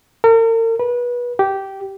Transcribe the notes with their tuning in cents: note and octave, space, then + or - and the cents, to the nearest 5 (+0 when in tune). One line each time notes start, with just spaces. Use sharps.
A#4 -40
B4 -25
G4 -15